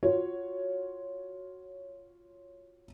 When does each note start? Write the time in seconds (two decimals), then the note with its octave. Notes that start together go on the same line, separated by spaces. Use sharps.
0.03 F4 F#4 C#5